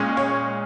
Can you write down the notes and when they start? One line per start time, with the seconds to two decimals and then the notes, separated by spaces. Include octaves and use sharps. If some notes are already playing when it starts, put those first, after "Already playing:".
Already playing: A#2 G#3 C#4
0.17 C#5